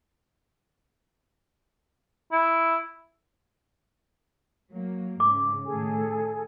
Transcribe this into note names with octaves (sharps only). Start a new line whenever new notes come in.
E4
F#3 A#3
G#2 C#3 D6
A2 D#3 G#4 A4 G#5